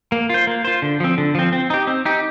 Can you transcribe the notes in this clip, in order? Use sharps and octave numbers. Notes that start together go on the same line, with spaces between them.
A#3
F4 C5
A#3
F4 C5
D3
F3 C4
D3
F3 C4
C4
D#4 G4
C4
D#4 G4